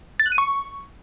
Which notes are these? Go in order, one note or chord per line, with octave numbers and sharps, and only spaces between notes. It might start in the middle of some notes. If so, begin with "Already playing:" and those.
A6
F#6
D#7
C#6